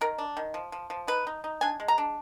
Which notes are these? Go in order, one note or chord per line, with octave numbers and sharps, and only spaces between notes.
D#3 A#4
D4
D#3
F3
F3
F3
D#4 B4
D#4
D#4
D4 G#5
G#3
A#5
D4